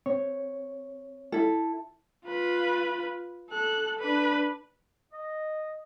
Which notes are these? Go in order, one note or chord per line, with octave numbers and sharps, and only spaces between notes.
C4 C#5 C#6
E4 A4
F4 B4
A4 F#6
D4 B4
D#5